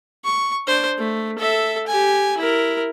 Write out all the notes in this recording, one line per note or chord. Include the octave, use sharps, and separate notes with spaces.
C#6
D4 C5
A3
A4 E5
G4 G#5
E4 A#4